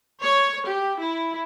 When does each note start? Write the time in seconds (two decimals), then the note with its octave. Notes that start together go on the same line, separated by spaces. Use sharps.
0.22 C#5
0.67 G4
0.99 E4